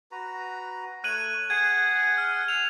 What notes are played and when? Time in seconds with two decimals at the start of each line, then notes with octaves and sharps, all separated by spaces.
0.11 F#4 B4 A#5
1.04 A3 C#5 F#6 D#7 F#7
1.50 G#4 F#5 G#5 G#6 D#7
2.18 F6
2.48 E6 F7